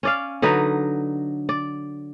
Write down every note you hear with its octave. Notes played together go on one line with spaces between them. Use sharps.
C#4 D5 F5
D3 F#3 D#4 B4
D5